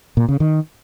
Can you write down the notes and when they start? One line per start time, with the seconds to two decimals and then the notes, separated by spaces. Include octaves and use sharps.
0.17 A#2
0.29 C#3
0.40 D#3